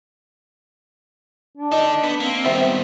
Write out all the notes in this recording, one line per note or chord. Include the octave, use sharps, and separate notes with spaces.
D4
D#4 A4 D5
B3
A#3 C4
D#3 G3 B3 C4 E5